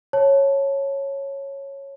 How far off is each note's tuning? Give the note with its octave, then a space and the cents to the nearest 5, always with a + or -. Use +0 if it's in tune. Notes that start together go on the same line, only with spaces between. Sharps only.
C#5 -10 A5 +0